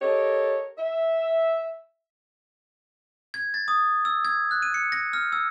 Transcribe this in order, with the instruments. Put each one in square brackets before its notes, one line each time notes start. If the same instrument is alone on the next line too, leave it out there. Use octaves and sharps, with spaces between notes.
[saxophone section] G4 A4 A#4 C#5 D#5
E5
[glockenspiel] G#6
A6
D#6
E6
G#6
F#6
D#7
C#7
A#6
F6
E6